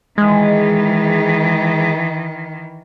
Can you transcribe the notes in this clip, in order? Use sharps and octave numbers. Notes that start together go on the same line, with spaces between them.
D#3 E3 G#3